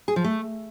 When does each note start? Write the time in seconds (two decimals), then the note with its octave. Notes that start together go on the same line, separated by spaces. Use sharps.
0.08 G#4
0.16 F3
0.24 A3